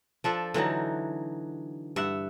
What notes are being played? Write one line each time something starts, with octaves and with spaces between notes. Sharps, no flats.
F3 D4 A4
D3 E3 F#3 D#4
G2 E5 F#5